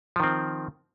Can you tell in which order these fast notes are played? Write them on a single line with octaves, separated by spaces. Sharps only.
F3 D#3 C4